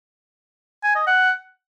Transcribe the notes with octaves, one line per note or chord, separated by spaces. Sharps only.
G#5
D#5
F#5